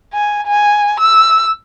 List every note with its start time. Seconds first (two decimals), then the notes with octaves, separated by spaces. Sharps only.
0.14 G#5
0.47 G#5
1.00 E6